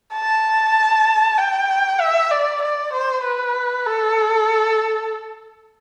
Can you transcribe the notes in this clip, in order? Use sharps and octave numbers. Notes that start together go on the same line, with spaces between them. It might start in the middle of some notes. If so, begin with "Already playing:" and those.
A5
G5
E5
D5
D5
C5
B4
A4